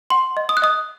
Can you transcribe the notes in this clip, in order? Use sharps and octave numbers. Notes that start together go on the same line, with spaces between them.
F#5 C6
D#5
D#6
F#6
D#5 D#6